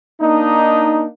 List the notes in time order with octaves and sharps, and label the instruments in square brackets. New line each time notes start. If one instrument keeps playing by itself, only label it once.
[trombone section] A#3 D4 D#4